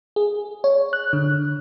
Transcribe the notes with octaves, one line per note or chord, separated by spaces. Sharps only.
G#4
C#5
F#6
D3